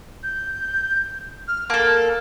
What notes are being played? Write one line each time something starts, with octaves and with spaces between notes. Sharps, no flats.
G6
F6
A#3 A4 A5